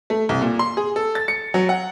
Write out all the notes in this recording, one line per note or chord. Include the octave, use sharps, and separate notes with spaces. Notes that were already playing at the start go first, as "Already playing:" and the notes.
A3
C2
A#2
C6
G#4
A4
A6
C#7
F#3
F#5